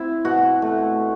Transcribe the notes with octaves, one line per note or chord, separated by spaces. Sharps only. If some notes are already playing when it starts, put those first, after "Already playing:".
Already playing: C4 E4
B2 F#4
A3